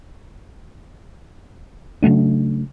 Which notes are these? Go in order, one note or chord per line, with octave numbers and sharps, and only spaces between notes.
C#3 F#3 A3 D4